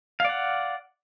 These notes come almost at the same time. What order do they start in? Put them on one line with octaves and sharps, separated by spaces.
F5 D5 F#5